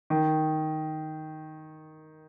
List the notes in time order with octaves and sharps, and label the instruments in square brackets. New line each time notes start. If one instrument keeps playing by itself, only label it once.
[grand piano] D#3